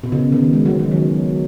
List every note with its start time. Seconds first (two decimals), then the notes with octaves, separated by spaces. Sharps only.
0.03 B2
0.12 C#3
0.32 D#3
0.53 G#3
0.66 F#3
0.79 D#3
0.91 F#3